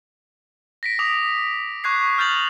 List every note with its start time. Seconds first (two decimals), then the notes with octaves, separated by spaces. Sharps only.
0.83 A#6 B6 D7
0.99 D6 D#6 F7
1.84 C#6 F#6 G#6 C7
2.18 F6 G6 A6 F7 F#7